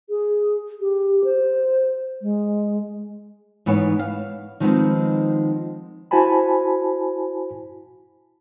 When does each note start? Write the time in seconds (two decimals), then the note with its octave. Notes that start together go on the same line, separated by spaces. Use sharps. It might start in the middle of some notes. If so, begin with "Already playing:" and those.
0.10 G#4
0.81 G4
1.24 C5
2.22 G#3
3.66 G#2 E3 B3 C#5
3.99 F5
4.60 D#3 F3 G#3 B3 C4 D#4
6.11 E4 F#4 C5 G#5 A5 B5